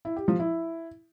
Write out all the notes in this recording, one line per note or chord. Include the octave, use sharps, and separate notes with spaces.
E4
G4
F3
E4